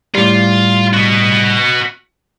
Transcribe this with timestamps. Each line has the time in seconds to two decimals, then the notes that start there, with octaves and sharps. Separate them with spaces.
0.14 A2 G3 F4
0.93 F#4 D#5